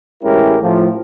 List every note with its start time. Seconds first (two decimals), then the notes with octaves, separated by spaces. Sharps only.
0.22 A1 G#3 C#4 E4 G4 A#4
0.62 A2 F3 A3